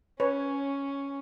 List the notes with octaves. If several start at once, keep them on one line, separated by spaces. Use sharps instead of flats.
C#4 B4 C#5